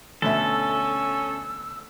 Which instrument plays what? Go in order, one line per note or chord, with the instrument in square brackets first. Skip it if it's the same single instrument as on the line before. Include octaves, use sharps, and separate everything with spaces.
[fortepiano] D2 B2 E5 [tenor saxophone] C#4 [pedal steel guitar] A4 [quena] E6